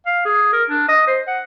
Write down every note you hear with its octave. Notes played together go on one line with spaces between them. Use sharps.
F5
G#4
A#4
D4
D#5
C5
F#5